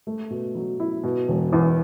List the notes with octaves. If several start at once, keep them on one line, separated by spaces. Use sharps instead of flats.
A3
B2
F#3
E4
B2
E1
E2